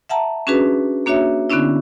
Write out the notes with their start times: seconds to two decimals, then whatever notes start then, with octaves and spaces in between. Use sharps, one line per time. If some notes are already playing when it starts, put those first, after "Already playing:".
0.09 E5 F#5 A5 A#5
0.47 C#4 D4 F#4 G#4 B4
1.06 A#3 D4 F#4 C#5 E5
1.50 D3 B3 C#4 D4 E4